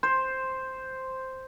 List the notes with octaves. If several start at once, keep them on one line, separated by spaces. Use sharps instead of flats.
C5